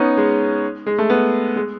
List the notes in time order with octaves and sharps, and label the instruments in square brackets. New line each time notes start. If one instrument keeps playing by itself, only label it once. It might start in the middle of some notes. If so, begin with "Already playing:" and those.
Already playing: [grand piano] B3 C#4 D#4
G#3
G#3
A3
B3
G#3